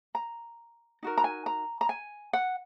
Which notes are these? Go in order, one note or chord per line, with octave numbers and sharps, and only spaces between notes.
A#5
D#4 F#4 A#4
A#5
G#5
A#5
A#5
G#5
F#5